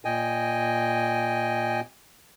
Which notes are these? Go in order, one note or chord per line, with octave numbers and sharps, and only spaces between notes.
A#2 D#5 G5 G#5